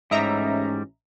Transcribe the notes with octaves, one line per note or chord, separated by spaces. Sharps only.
A1 G#2 G3 C#4 D#5 E5 A#5